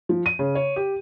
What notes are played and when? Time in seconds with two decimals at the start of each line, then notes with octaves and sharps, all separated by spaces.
0.09 F3
0.26 D#7
0.39 C#3
0.55 C#5
0.76 G4